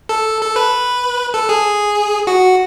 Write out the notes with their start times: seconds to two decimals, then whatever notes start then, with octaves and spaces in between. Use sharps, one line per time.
0.09 A4
0.41 A4
0.56 B4
1.34 A4
1.49 G#4
2.27 F#4